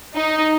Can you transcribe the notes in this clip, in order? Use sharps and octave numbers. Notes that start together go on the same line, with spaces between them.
D#4